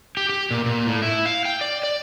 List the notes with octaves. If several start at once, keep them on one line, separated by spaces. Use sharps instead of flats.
G4
G4
A#2
A#2
A2
E4
F5
G5
D5
D5